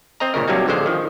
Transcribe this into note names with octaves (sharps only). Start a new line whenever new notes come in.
C4 D#5 A#5
G#1 D2 A#2 C#3 A#4
G2 C3 F#3 G3 A#3 D#4
A1 F2 D3 G#3 C5
D#3 F3